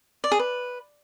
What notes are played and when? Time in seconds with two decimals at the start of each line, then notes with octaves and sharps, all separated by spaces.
0.24 D5
0.32 G#4
0.39 B4